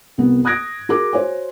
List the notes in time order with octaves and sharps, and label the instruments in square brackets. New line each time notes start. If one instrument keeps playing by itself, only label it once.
[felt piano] C2 B3
D#6 F#6 G#6 A#6 D7
F#4 G#4 A#4 D6
F#4 C5 C#5 G#5